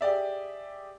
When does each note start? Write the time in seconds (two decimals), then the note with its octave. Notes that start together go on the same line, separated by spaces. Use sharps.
0.01 G4 G#4 D5 E5